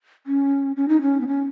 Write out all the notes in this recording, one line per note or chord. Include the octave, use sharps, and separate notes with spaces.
C#4
C#4
D#4
C#4
B3
C#4